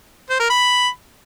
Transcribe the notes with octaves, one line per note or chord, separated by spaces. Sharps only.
C5
A#4
B5